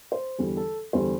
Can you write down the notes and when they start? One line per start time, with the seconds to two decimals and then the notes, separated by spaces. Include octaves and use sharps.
0.12 C5
0.39 E2 D3 G3
0.57 A4
0.93 E2 D3 G3 C5